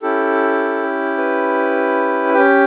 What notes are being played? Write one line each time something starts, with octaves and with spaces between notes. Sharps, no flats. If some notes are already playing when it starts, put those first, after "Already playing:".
C#4 E4 G4 A4
B4
C#4 G4